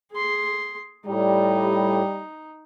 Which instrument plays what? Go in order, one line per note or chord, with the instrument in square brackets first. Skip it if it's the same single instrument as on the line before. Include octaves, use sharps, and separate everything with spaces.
[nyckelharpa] G#4 C6
[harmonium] A2 [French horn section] G3 [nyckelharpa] D#4